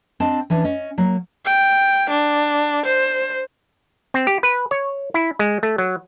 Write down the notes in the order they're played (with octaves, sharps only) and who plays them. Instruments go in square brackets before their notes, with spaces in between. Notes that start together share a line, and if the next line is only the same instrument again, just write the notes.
[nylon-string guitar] C4 D4 D#5 A5
E3 C#4 D4
C#4 D#5
F#3 A#3
[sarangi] G5
D4
C5
[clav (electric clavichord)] C4
G4
B4
C#5
E4
G#3
A3
F#3